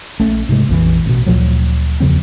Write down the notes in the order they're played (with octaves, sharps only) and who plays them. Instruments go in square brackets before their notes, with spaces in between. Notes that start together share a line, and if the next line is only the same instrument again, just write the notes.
[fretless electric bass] A#1 A3 C#4
G#2 C3 G#3
A#1 F2 D3 E3
A1 B2
D2 A#2 F3 F#3
E2 C#3 F3 C4